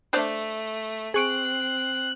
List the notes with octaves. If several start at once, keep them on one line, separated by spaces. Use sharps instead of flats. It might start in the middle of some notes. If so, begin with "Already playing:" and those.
A3 D4 C5 D5
C4 G#4 C#6 F#6 D7